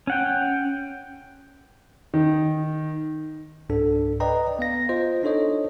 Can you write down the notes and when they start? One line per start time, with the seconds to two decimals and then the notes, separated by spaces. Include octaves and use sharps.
0.07 C#4 F#5 G5
2.14 D#3
3.69 C#2 G#2 D4 A4
4.20 B4 D5 D#5 G5 A#5
4.59 B3 F5 A#6
4.89 F4 C5 D#5
5.23 D4 D#4 A4 C#5 D#5